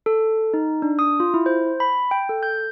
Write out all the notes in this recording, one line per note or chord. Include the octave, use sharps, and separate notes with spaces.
A4
D#4
D4
D#6
F4
E4
C5
B5
G5
A4
G6